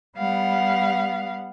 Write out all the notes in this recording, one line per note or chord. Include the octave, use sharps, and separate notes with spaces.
G3 B3 F5 F#5